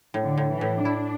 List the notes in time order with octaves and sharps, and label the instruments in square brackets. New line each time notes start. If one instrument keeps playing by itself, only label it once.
[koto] A2
[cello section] D3
[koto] A2
[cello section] E3
[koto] A2
[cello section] D4 [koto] E4